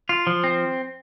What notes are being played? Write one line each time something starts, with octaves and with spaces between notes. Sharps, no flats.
F4
F3
C4